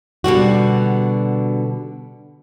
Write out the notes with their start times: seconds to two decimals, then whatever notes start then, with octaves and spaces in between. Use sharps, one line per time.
0.24 B2 D3 G3 F#4